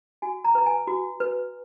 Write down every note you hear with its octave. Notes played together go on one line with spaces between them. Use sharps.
F#4 G#5
A#5
B4 A#5
G#5
F#4
B4